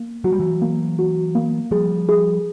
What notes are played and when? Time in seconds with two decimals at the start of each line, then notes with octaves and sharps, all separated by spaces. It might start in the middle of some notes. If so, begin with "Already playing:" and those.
Already playing: A#3
0.24 F#3 F#4
0.32 G3
0.40 E3 F#3
0.62 A#3
0.99 F#4
1.35 A#3
1.71 F3 G3 G#4
2.09 G#4